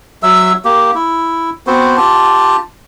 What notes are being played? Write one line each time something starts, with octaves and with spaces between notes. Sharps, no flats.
F#3 E5 E6
A#3 G4
E4
B3 C4 F#4 C5
F4 G4 A5